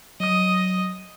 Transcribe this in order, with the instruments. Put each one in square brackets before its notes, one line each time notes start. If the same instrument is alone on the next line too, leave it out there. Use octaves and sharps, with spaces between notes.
[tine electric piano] F#3 D#6 [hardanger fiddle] D#5